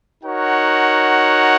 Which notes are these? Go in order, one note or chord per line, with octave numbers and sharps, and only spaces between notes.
D#4 F#4 A#4 C#5 F#5